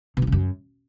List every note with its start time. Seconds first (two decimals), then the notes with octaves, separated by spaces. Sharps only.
0.17 B2
0.22 D#3
0.27 C#3
0.32 F#2